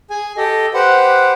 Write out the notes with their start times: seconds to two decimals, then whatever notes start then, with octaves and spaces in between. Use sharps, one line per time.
0.10 G#4 G#5
0.37 G4 A4 D#5
0.74 G4 B4 C5 F#5